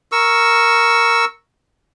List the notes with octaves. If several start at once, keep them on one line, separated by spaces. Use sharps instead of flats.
A#4 C#6 E6